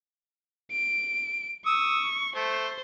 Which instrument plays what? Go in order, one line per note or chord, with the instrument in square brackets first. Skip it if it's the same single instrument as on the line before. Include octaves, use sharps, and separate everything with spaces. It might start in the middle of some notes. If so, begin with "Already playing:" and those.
[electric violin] D7
[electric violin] C#6 [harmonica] D#6 E6
[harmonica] A3 [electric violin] C5